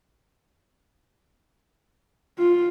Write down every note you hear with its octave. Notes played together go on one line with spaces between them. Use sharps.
F4